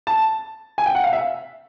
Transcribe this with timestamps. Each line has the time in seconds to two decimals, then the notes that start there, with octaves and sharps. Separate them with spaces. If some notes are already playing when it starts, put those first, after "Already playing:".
0.07 A5
0.78 G#5
0.86 G5
0.95 F#5
1.04 F5
1.13 E5